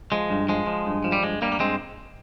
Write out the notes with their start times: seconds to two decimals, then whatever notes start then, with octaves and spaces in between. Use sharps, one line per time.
0.12 F3 G#3
0.30 G2
0.49 F3 G#3
0.67 F3
0.86 G2
1.04 F3
1.12 G3
1.23 G2 G#3
1.42 G2 G3 A#3
1.52 A#3
1.60 G2 G#3 C4